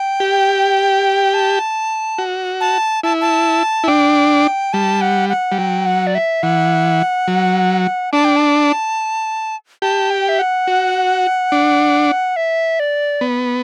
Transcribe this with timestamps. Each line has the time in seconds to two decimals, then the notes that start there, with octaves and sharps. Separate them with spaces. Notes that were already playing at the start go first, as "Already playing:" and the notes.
Already playing: G5
0.20 G4
1.34 A5
2.18 F#4
2.61 A5
3.03 E4 A5
3.21 A5
3.84 E4
3.88 D4 G5
4.73 G3 A5
5.01 F#5
5.29 F#5
5.52 G3
5.58 F#3 G5
5.86 F#5
6.07 D5
6.15 E5
6.43 E3 F#5
7.28 F#3
8.13 D4 A5
8.25 G5
8.36 A5
9.82 G4 A5
10.10 G5
10.29 E5
10.39 F#5
10.67 F#4
11.52 D4
12.36 E5
12.80 D5
13.21 B3